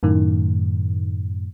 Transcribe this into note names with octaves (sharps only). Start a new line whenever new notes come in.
F#2 A2 D#3